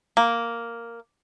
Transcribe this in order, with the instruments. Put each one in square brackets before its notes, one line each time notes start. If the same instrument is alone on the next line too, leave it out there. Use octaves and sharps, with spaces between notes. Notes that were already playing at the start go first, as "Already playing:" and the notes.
[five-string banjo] A#3